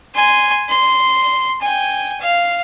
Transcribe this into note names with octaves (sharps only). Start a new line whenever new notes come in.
G#5 C6
C6
G5 G#5
F5